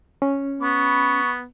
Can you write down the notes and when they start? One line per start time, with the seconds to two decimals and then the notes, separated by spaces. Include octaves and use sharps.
0.22 C#4
0.61 B3 B5 C#6